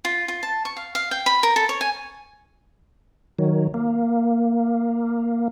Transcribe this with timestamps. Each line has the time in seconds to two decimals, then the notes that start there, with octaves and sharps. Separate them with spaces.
0.05 F4
0.28 F4
0.43 A5
0.65 C#6
0.77 F5
0.95 F5
1.11 G5
1.26 B5
1.43 A#4
1.56 A4
1.69 C#5
1.81 G#5
3.39 D#3 F#3
3.74 A#3